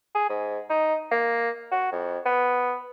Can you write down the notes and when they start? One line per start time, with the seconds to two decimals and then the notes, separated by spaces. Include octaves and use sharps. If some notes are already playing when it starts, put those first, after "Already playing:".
0.15 G#4
0.30 G#2
0.70 D#4
1.11 A#3
1.72 F#4
1.92 F2
2.26 B3